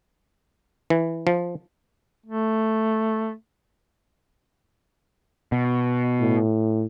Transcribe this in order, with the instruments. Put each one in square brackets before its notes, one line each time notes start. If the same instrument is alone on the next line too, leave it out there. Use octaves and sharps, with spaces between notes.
[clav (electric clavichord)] E3
F3
[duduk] A3
[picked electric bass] B2
[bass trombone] A2